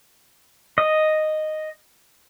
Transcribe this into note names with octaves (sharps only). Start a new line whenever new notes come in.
D#5